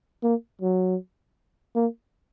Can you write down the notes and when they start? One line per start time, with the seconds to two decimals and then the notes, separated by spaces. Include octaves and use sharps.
0.23 A#3
0.61 F#3
1.75 A#3